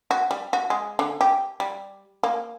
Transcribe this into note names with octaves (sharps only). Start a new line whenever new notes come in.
F#4
G3
F#4
G#3
D3
G4
G3
A#3